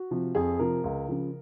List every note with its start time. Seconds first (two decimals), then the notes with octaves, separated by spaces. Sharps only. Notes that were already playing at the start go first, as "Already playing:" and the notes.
Already playing: F#4
0.11 C3 F3
0.35 F2 G#4
0.59 C3 F3 A#4
0.84 C#2
1.08 C#3 F3